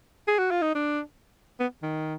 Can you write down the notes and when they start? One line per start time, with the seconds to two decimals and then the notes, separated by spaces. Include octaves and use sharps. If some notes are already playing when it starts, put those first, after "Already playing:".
0.28 G#4
0.38 F#4
0.51 F4
0.62 D#4
0.75 D4
1.60 B3
1.83 D#3